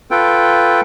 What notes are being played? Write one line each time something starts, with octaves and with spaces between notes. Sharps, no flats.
F4 A4 B4 G5